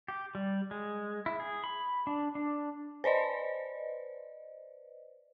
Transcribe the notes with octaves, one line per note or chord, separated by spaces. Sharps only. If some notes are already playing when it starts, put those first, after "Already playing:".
G4
G3
G#3
E4
G#4
B5
D4
D4
B4 C5 D5 D#5